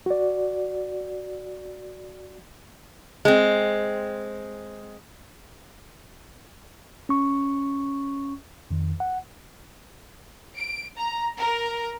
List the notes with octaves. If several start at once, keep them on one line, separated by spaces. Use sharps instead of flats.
F#4 D5
G#3 C4
C#4 C#6
F2 D#3
F#5
D7
A#5
A#4